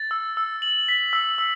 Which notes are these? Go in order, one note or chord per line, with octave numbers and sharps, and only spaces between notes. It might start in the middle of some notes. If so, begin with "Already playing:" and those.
Already playing: A6
E6
E6
F#7
B6
E6
E6